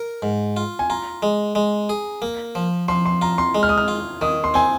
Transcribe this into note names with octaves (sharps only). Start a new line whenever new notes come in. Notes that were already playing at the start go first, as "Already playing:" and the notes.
Already playing: A#4
G#2
F4
G#5
F4 A#5
G#3
G#3
G#4
A#3
F3
F3 C6
C6
F4 A#5
C6
G#3
F6
D#6
F6
F4
D#3 D#6
C6
C4 G#5